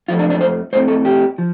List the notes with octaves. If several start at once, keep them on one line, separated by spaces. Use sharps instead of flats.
F2 F3 A3 F4
D4
D4
C5
A2 A3 C4 C5
A4
G4
F3